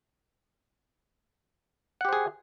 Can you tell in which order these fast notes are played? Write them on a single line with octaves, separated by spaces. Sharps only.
F#5 G4 C5 G#4